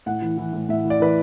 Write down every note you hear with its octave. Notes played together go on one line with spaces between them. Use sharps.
A2 F#5
E3
E3
A2
A2 E5
E3
D5
E3 B4